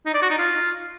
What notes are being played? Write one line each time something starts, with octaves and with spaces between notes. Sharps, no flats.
D#4
D5
F#4
D#4
F4